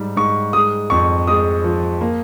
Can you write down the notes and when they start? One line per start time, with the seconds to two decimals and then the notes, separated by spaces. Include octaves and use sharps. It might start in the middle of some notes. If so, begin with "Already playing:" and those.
Already playing: G#2 G3
0.16 G#2 C#6
0.53 G#3 D#6
0.90 F2 C#6
1.27 G#3 D#6
1.64 F3
2.01 A#3